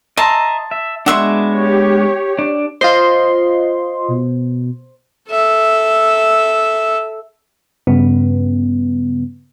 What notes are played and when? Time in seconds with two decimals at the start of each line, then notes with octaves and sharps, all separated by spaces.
0.17 D#5 E5 A5 A#5 C6
0.71 E5
1.06 G#3 B3 D4 F#4 E5 C6
1.54 G4 C#5
2.39 D4
2.81 F4 C5 D#5 C6
4.08 B2
5.29 A4 E5
7.87 G2 C#3 B3